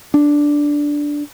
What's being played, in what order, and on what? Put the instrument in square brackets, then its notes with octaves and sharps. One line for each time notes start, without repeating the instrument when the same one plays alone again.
[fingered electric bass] D4